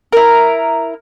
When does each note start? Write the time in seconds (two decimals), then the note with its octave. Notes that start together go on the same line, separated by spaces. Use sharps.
0.13 E4 A#4